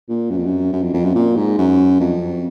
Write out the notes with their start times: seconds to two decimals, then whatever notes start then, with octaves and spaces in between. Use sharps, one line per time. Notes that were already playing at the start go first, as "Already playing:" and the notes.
0.09 A#2
0.30 F#2
0.37 F2
0.45 F#2
0.72 F#2
0.82 F2
0.94 F2
1.04 F#2
1.15 A#2
1.36 G#2
1.58 F#2
2.00 F2